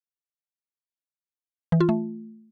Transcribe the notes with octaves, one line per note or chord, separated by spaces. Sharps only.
E3
F4
A3